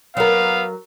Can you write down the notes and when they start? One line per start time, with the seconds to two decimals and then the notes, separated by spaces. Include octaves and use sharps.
0.17 F#3 B3 A#4 F5